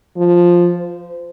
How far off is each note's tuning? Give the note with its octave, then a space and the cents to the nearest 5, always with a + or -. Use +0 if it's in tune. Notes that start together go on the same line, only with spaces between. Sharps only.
F3 +5
C5 -25